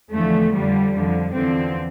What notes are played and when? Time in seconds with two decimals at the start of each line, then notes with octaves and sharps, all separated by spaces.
0.12 E2 D3 F3 A3
0.52 F2 D3 F3 G3
0.92 F2 D3 F3
1.33 E2 D3 F3 C4